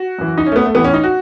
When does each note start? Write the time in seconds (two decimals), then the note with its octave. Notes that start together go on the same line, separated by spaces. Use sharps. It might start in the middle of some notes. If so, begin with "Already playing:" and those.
Already playing: F#4
0.19 F#2 E3
0.38 D#4
0.46 C#4
0.52 A3
0.56 B3
0.66 A3
0.75 A2 E3 B3
0.84 C#4
0.94 D#4
1.04 F#4